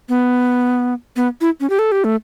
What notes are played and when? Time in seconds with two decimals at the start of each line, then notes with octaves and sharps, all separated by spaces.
0.09 B3
1.16 B3
1.41 E4
1.60 C#4
1.70 G4
1.79 A4
1.92 G4
2.04 A3